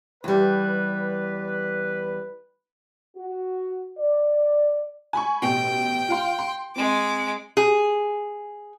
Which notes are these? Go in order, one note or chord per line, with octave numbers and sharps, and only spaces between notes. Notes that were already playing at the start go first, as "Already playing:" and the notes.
E2 G3 B4
F#4
D5
G#5 B5 C#6
A1 B2 G5
F4 F5 C6
C6
G#3 C4 D6
G#4